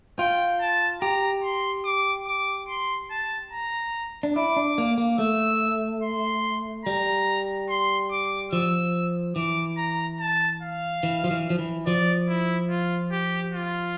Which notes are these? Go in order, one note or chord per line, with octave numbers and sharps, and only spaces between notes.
F4 G5
A5
G4 A#5
C6
D6
D6
C6
A5
A#5
D4
E4 D6
D4
A#3
A#3
A3 E6
C6
G3 A#5
C6
D6
F3 E6
E3 D6
A#5
A5
F5
E3
F3
E3
F3
E3
F3 D5
E4
F4
G4
F4